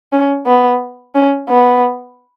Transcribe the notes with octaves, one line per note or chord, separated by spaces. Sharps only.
C#4
B3
C#4
B3